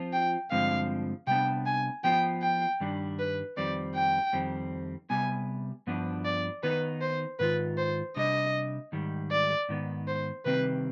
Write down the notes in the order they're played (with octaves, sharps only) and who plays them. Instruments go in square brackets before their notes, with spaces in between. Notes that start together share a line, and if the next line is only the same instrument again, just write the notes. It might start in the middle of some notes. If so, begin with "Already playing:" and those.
Already playing: [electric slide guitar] F3 C4 F4
[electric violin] G5
[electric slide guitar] G2 D3 F3 G#3 C4 [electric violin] F5
[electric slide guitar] C3 G3 B3 D4 [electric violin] G5
[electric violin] G#5
[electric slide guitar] F3 B3 F4 [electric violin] G5
[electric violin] G5
[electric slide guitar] G2 D#3 G3 D4
[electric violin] B4
[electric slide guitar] F2 D#3 G3 C4 [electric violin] D5
[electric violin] G5
[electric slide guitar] F2 D#3 G3 C4
[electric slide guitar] C3 G3 B3 [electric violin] G#5
[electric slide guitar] G2 F3 B3 D4
[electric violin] D5
[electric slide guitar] D#3 B3 D#4 [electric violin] B4
[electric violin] C5
[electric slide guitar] G#2 D#3 F4 [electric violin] B4
[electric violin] C5
[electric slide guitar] C3 G3 D4 [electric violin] D#5
[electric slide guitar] G#2 D#3 G3
[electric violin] D5
[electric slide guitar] G#2 D#3 B3
[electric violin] C5
[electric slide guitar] C3 D#3 G3 C4 [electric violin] B4